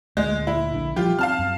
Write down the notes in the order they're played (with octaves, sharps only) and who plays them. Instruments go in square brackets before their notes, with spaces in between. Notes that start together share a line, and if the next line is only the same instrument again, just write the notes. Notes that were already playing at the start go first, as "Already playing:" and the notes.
[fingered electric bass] D2 A#2 [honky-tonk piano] G#3
[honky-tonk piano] E4
[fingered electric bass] A#1 D3
[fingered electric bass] F3 G3 [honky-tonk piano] F4 G4
[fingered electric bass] C4 [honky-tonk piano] F5 A5 F6
[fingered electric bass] F#2